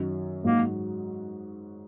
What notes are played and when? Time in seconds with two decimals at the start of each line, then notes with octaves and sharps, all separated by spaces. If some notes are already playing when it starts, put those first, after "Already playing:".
Already playing: F#2 D#3 F#3 D#4
0.44 G#2 F#3 A#3 D#4 F#4